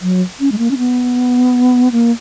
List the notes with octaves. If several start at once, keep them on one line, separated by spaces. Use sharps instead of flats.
F#3
C#4
G#3
A#3
C#4
B3
A#3